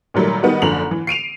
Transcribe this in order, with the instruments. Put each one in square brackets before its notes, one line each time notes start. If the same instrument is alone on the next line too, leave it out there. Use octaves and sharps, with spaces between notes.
[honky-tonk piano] A#2 D#3 F#3 G3 A3
D#3 G3 B3 D#4 F#4
F#1 D3 F3 A#5 F7 F#7
E3
C7 D7 D#7 F7